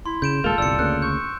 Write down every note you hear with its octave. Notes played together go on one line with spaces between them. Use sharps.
E4 C6
C#3 G6 D7 E7
D#1 G#3 A#3 F4 A4
G1 C2 D5 E6 C#7
D2 C#3 A#3 F#6
C#6 G6